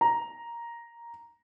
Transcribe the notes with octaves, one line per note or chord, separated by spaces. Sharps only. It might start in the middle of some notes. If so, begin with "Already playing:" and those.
A#5